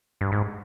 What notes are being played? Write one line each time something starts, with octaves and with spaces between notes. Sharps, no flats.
G2
G#2